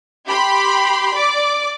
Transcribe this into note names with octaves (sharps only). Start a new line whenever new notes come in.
G4 B5 C6
D5 D6